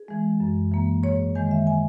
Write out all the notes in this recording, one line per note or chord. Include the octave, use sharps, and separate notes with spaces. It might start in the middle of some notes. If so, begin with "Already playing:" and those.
Already playing: G#4
E3 G#3
F#2
E3 A#3
G#2 C#5
D#3 G#3 G#5
E5
G#5